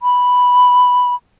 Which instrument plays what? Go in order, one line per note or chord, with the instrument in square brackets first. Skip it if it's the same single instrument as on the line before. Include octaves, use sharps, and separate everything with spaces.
[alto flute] B5